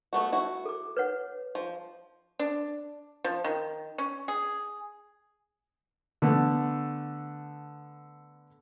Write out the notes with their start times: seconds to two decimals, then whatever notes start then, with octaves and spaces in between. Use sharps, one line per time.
0.13 A3 B3 F#4
0.32 E4 F#4
0.65 A4 D6
0.97 B4 C#5 F#5
1.55 F3
2.39 D4
3.24 F3
3.44 D#3
3.98 C#4
4.28 G#4
6.22 D3 A3 B3